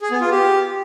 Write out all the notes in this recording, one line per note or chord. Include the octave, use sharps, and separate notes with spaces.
G#4
B3
F4
G4